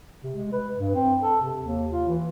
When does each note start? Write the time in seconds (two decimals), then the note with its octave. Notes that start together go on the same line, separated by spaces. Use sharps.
0.24 C3
0.35 G#3
0.52 B4
0.78 G2
0.95 C4
1.22 A4
1.41 C3
1.61 D#2
1.92 F4
2.08 E3